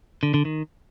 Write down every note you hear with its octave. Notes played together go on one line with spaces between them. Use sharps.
D3
D3
D#3